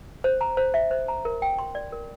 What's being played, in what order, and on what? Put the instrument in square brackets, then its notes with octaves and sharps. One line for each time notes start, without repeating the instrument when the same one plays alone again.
[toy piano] C5
A#5
C5
E5
C5
A#5
A#4
G5
C6
D5
A#4